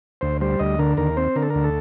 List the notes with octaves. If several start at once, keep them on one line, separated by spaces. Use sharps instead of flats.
D2 C5
G3 C5
D2 D#5
D3 A#4
D#2 A#4
C4 C5
D3 A#4
A4
D2 A#4
A4